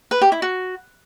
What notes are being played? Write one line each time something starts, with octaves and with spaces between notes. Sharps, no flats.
B4
G4
E4
F#4